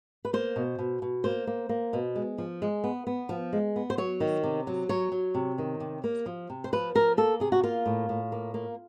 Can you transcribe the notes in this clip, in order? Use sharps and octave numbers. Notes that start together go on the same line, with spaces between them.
B4
A#3 C5
B2
B2
B2
A#3 C5
A#3
A#3
B2
G#3
F3
G#3
B3
B3
F3
G#3
B3
C5
F#3 C#5
D#3
C3
F#3
F#3 C#5
F#3
C3
D#3
C3
A#3
F3
C3
C5
F3 B4
F3 A#4
A#3 A4
C3 G#4
F#4
A#3 F4
A2
A2
A#3
A#3